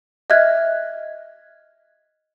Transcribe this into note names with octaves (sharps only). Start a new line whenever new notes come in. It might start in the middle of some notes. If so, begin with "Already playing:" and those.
D#5 E5 F6 F#6 G#6